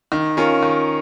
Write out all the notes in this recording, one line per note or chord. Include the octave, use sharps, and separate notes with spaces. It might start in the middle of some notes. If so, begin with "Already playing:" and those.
D#3
C#4 F4 A#4
D#3